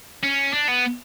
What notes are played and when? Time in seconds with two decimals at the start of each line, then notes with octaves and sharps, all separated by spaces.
0.24 C#4
0.54 D4
0.69 B3